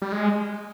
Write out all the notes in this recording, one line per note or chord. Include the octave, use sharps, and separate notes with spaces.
G3
G#3